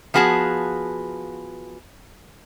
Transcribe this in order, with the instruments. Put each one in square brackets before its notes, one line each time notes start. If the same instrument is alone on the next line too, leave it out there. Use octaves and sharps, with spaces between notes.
[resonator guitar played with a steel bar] F3 B3 F#4 G#4 A5